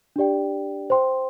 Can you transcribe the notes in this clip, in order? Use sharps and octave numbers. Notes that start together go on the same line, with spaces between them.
D4 G4 D5 G5
C5 G5 C6